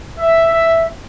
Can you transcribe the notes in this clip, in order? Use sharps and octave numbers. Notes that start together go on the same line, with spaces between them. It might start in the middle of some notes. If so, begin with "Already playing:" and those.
E5